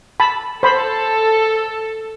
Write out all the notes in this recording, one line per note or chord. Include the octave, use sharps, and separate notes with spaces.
A5 B5
A4 C5 B5